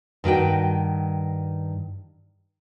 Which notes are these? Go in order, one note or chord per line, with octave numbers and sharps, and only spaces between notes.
G2 D#3 F#4 G5